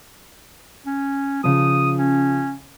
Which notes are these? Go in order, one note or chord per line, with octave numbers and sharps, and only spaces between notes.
C#4
C#3 F3 D#6
C#4